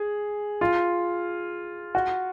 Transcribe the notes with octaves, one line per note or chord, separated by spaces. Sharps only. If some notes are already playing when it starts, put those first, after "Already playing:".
Already playing: G#4
F4
F#4